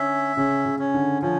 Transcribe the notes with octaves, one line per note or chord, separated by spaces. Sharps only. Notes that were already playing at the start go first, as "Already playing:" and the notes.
Already playing: D3 C#4 E5
C#3 C#4
C#3
C#4
D3
F3 C#4